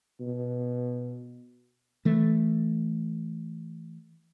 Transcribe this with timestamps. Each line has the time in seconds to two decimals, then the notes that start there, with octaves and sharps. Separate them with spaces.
0.21 B2
2.05 E3 A3